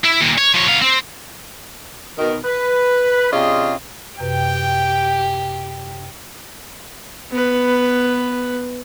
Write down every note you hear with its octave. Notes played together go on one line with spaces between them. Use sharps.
E4
A#2 D#3
C#5
F3 C#5
B3 F5
C4
B2 D#3 A#4
B4
C3 C#4 D4 F4 G#4 D#5
F#2 C3 G4 B4 G5
B3 B4